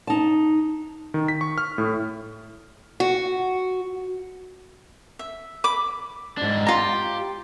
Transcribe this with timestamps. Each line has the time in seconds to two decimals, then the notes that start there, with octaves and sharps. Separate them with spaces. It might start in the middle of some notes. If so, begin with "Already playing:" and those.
0.07 D#4 A5
1.14 D#3
1.28 B6
1.41 C#6
1.58 F6
1.78 A2
3.00 F#4
5.19 E5
5.64 B5 D6
6.37 G#2 D4
6.67 F4 G4 A#5